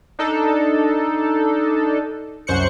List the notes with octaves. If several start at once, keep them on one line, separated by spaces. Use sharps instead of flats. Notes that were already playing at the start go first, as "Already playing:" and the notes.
D4 D#4 A4
C2 F#2 C5 C#6 F#6 C#7